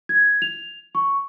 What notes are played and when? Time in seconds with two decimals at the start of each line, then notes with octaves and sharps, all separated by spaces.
0.09 G#6
0.42 F7
0.95 C#6